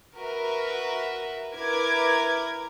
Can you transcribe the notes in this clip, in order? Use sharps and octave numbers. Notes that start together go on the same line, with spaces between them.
F#4 A#4 B4 E5
E4 A#4 B4 D6 G#6